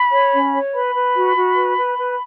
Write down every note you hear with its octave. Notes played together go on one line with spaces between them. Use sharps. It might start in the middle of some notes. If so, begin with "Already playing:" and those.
Already playing: B5
C#5
C#4
C#5
B4 B5
B4
F#4
F#4
B4
B4
B4